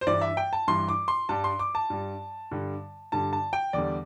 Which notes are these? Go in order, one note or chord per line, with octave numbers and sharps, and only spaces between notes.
C5
G2 E3 G3 D5
E5
G5
A5
G2 E3 G3 C6
D6
C6
G2 G3 A5
C6
D6
A5
G2 G3
G2 D3 G3
G2 D3 G3 A5
A5
G5
E2 D3 G3 D5